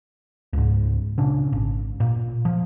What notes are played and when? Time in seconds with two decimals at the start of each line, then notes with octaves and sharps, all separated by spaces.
0.53 C#2 G#2
1.18 A#2 C#3 C#4 D4
1.52 G#1
2.00 A#2
2.45 F3